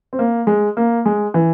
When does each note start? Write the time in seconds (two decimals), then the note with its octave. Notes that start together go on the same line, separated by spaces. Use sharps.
0.13 C4
0.19 A#3
0.47 G#3
0.77 A#3
1.06 G#3
1.34 E3